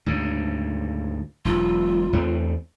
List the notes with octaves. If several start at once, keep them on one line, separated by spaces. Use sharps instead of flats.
D2 G#2 C#3
E1 B1 F4
E2 A3 C4